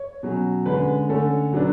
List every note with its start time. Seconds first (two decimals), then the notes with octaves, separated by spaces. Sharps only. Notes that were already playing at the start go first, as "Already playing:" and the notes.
Already playing: C#5
0.23 B2 F#3 C#4
0.66 D3 G#3 C#4 B4
1.09 D3 A3 C#4 A4
1.53 B2 F#3 B3 D4